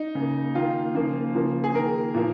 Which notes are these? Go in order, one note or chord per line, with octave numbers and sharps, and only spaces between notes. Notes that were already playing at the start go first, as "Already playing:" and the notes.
Already playing: D#4
C#3 A#3
D#3 A#3 F4
C#3 F3 A#3
C#3 F3 A#3
G#4
D#3 A#3 A#4
A#2 F3 A#3